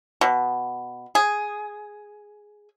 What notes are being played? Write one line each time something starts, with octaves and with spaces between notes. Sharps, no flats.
B2
G#4